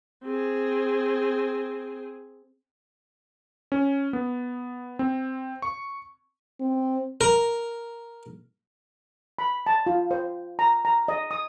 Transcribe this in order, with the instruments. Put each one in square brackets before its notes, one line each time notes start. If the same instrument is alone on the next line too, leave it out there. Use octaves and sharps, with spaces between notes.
[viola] C4 G#4
[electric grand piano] C#4
B3
C4
C#6
[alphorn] C4
[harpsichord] A#4
[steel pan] B5
A5
F4
C5
A#5
A#5
D#5
D#6